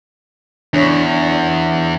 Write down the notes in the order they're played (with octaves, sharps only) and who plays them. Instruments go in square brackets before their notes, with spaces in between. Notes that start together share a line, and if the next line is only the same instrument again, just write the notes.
[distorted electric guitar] E2 [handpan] D4 C#5